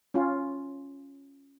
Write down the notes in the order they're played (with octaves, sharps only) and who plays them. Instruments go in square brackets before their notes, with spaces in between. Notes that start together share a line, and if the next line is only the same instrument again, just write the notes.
[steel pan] C#4 F4